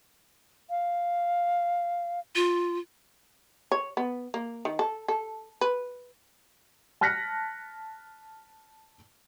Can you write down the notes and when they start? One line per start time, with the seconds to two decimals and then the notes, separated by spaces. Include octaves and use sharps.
0.70 F5
2.35 F4
3.72 C#5
3.97 B3
4.34 A#3
4.65 D#3
4.79 A4
5.08 A4
5.61 B4
7.01 A5 F6 F#6 A#6 B6 C#7